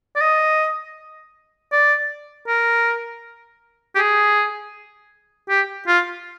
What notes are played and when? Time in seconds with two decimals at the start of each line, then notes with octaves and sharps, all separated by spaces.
0.16 D5
0.21 D#5
1.72 D5
2.48 A#4
3.95 G4
3.98 G#4
5.49 G4
5.87 F4